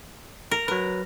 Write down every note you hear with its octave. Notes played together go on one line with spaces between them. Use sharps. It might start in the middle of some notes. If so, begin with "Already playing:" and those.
A#4
F#3 A#4 B4